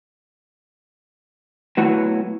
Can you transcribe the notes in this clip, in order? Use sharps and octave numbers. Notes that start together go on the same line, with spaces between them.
F#3 A3 B3 E4 F#4